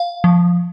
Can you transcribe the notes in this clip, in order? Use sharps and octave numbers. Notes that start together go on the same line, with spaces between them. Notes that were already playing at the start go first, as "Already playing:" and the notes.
Already playing: F5
F3